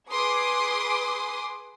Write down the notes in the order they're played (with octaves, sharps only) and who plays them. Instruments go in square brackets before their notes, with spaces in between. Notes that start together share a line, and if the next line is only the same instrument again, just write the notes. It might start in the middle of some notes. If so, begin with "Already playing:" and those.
[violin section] G#4 B4 C6 D6 D#6